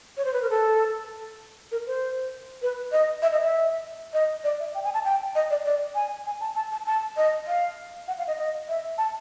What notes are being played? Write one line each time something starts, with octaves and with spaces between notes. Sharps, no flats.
C#5
C5
B4
A#4
A4
A#4
C5
B4
D#5
E5
D#5
E5
D#5
D5
E5
G5
G#5
A5
G5
D#5
D5
D5
G#5
G#5
A5
A5
A5
A5
D#5
F5
F#5
F5
D#5
D#5
E5
A5